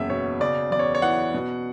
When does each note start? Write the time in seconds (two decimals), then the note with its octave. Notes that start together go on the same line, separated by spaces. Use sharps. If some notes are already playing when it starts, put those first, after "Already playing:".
Already playing: F#1 E2 E5
0.10 B2 C#5
0.40 C#3 D5
0.71 E2 D5
0.79 C#5
0.95 C#5
1.02 E3 F#5
1.34 B2